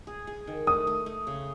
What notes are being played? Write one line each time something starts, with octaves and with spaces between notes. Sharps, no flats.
G#4
G#4
D#3
A3 D#6
A3
A3
C#3